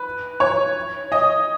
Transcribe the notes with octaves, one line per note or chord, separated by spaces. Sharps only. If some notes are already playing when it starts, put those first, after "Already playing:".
Already playing: B4
C#5
D#5